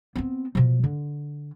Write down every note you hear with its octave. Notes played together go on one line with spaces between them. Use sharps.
B3 C4
B2 F3
D3